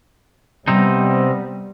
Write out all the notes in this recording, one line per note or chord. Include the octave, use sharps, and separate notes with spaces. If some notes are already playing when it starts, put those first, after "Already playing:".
C3 G3 B3 C4 D#4